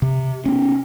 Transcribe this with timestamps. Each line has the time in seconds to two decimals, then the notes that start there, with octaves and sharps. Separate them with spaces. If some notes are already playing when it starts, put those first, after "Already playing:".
0.02 C3
0.46 B3 C#4